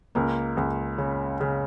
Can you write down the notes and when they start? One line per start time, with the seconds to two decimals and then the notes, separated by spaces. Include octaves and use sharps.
0.15 C#2 A#3
0.57 C#2
0.98 C#3
1.40 C#3